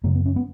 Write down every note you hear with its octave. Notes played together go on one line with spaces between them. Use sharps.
F#2 C#3 A#3
B3
C#4
B3